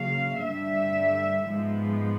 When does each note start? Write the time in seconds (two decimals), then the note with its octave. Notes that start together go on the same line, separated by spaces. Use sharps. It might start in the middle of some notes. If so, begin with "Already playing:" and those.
Already playing: C#3 F#3 A#3 F5
0.40 G2 D3 G3 E5
1.46 G#2 F3 G#3 B3